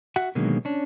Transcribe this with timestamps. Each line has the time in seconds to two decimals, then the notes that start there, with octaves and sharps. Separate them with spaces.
0.16 F#4 E5 F#5
0.35 B2 D3 D#3 F#3 G#3 A#3
0.65 C#4 D4